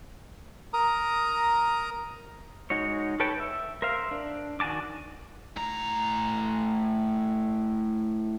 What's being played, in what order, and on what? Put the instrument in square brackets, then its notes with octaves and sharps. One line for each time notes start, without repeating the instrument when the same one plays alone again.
[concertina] A#4 A#5 D#6
[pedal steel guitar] G#3 D#4 F#4 C#5
A4 B4 C#5 G5 A5
E5
A#4 C5 E5 F5
D4
D#3 F#4 G#5 A5 D6
[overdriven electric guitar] A2 A#5